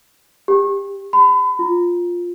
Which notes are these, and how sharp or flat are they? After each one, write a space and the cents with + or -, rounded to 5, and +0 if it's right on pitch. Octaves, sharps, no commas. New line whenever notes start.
G4 +25
B5 +35
F4 +5